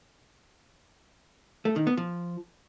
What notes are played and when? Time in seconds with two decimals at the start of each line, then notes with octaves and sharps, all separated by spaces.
1.65 A3
1.76 D#3
1.87 B3
1.97 F3